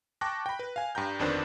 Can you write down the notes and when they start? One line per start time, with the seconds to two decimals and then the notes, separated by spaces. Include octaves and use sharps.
0.21 G5 A5 C#6 D6 F#6 A#6
0.46 G5 B5
0.59 B4
0.76 F5 G#5
0.95 G2 G5 A#5 G6
1.19 G1 F2 D#3 D4 B4 C5